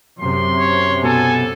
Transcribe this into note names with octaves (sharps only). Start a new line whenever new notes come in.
F#2 C3 C6
C#5
B2 A4 G#5